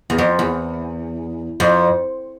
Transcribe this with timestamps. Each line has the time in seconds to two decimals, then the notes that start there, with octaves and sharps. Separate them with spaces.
0.10 E2
0.18 F2
0.39 E2
1.60 F2